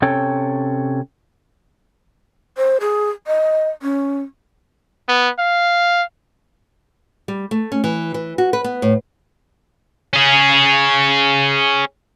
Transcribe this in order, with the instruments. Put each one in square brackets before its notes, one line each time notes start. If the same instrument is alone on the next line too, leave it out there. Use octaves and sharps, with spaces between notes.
[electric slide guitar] C3 C#4 A4 C#5 G5
[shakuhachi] C5
G#4
D#5
C#4
[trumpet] B3
F5
[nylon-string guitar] G3
A3
C#4
E3
E3
F#4
B4
B3
A2
[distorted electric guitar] C#4 G#4